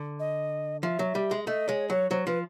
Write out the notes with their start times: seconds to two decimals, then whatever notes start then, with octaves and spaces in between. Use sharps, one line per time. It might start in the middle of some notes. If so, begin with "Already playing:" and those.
Already playing: D3
0.20 D#5
0.83 F3 E5
0.99 F#3
1.15 G3
1.31 G#3
1.47 A3 D#5
1.68 G#3 C#5
1.90 F#3 C#5
2.11 F#3 C5
2.27 F3 B4